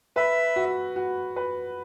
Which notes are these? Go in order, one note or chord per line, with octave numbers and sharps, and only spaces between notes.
B4 E5
F#4
F#4
B4